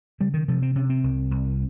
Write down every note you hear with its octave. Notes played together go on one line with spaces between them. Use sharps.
C#3 G3
D#3
C3 F3
C4
C3 C#4
C4
C2
C2